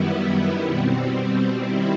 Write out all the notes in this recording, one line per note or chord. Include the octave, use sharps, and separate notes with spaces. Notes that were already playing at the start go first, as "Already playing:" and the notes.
Already playing: F#2 D#3 G3 B3 E4
B2 G3 C4
D#3 G3 C4 E4